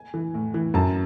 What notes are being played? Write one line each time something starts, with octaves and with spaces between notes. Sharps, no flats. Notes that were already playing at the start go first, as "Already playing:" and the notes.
Already playing: G#5
E3
A2
E3
F#2 A5